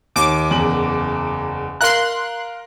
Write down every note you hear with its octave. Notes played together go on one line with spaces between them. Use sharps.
D#2 D6
F#1 E2 F#7
A#4 F5 A#5 C6 F#6